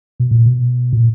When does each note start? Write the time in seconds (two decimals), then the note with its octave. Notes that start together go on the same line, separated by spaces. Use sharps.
0.20 B2
0.31 A#2
0.46 B2
0.93 A#2